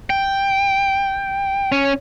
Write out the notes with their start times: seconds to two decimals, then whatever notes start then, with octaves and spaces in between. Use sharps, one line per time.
0.10 G5
1.72 C#4